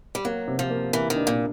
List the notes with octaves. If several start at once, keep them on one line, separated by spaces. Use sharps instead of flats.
G3
F#3 A#3
C3
F3
A#3
E3 A#3
D#3
D4
A#2